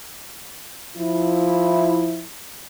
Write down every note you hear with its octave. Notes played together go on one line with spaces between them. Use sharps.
F3 E4